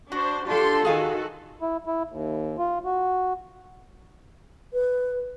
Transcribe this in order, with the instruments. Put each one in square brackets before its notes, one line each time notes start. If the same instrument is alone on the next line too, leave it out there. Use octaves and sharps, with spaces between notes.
[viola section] D4 C5 [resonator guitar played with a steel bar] F#4
[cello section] D4 F4 A4 [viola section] G4 C6
[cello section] D#3 [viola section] F#4 A4 [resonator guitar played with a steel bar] G#4 F5 G#5
[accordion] E4
E4
D#2
F4
F#4
[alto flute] B4